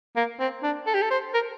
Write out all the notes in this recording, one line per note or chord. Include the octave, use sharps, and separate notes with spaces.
A#3
C4
D4
A4
G4
A4
C5
A#4